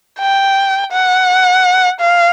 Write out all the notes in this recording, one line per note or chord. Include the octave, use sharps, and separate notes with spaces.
G5
F#5
F5